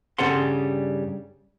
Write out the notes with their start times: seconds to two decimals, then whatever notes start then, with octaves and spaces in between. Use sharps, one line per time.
0.18 G2 C#3 G3 A4 F#5 C6